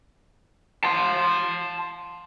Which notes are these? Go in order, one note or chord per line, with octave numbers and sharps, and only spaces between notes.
A5 C6